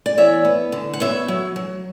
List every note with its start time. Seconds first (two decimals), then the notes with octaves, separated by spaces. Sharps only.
0.06 D5
0.18 E2 C#5 E5
0.45 B3
0.72 D3
0.94 F#5
1.00 B3 C#5 E5
1.28 F#3
1.56 F#3